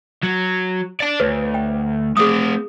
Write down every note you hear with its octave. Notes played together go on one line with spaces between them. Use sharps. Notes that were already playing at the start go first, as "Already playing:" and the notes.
F#3
D5 A5
D2 B4 C#5
G5
A3 C4 G#4 D#6